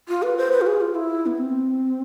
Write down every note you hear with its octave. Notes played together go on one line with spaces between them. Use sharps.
F4
B4
C5
B4
F4
G#4
F4
E4
B3
C4